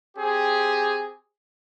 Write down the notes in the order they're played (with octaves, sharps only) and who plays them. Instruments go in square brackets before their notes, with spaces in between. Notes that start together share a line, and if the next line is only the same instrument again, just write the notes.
[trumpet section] C4 G4 G#4